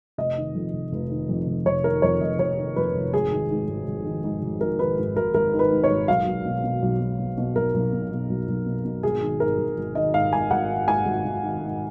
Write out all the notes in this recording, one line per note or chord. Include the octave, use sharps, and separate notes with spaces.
F1 D#5
D#3
F2
F1
F1
D#3
F2
F1
F1 C#5
D#3 A#4
F2 C#5
F1 D#5
F1 C#5
D#3
F2 B4
F1
G#1 G#4
D#3
G#2
G#1
G#1
D#3
G#2
G#1
G#1 A#4
D#3 B4
G#2
G#1 A#4
G#1 A#4
D#3
B4
G#2
C#5
G#1
B1 F5
B1
B2
B2
B1
B1
B2
B2
B1 A#4
B1
B2
B2
B1
B1
B2
B2
G#1 G#4
D#3
G#2 A#4
G#1
G#1
D#3 D#5
G#2 F5
G#1 G#5
G#1 F#5
D#3
G#2 G#5
G#1
G#1
D#3
G#2